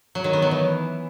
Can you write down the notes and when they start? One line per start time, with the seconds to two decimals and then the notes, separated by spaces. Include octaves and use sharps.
0.15 F#3
0.24 D#3
0.33 B3
0.42 F#3
0.51 E3